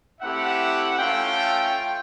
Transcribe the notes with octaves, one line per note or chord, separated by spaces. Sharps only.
A3 C4 E4 G4 E5 F#5
A3 C#4 F4 F5 G5